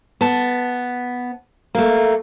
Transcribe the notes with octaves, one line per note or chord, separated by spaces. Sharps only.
B3 A5
A3 A#3